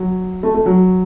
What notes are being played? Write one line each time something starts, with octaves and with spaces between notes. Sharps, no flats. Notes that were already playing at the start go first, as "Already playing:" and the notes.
Already playing: F#3
A3
A3
F#3